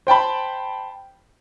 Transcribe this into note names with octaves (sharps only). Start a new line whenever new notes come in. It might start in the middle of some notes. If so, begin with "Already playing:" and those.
C5 G5 A5 B5